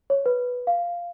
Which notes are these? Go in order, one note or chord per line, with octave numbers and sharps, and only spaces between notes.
C#5
B4
F5